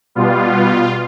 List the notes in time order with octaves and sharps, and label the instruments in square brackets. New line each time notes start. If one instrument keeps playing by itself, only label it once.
[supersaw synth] B2 G3 B3 F4